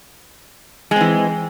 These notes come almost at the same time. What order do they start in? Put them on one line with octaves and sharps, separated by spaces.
G#3 C4 E3